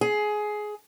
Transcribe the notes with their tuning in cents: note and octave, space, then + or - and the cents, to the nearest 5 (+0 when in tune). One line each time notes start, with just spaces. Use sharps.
G#4 +15